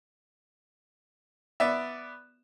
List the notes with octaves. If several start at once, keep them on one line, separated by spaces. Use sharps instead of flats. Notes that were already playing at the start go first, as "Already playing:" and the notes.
B3 D5 E5